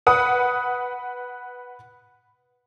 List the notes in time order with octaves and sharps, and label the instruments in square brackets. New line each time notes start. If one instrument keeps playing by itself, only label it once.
[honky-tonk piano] B4 F#5 D#6